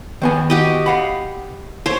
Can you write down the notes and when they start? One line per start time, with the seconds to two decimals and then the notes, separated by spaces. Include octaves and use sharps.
0.22 D#3 B3 G#5
0.50 F#4 G4 D#5
0.86 F5 F#5 B5
1.86 C5 C#5